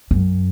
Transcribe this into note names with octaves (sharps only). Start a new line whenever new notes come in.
F#2